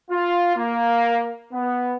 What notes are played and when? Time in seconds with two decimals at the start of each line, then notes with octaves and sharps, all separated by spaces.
0.11 F4
0.56 A#3
1.53 B3